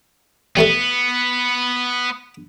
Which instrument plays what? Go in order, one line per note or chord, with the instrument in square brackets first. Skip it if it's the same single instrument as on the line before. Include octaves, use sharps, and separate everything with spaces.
[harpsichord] G3 A3 A4 [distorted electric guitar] B3